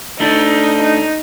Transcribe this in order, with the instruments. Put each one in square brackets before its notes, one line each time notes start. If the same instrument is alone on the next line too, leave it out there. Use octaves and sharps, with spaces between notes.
[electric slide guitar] A3 D4 [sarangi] D#4
[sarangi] D#4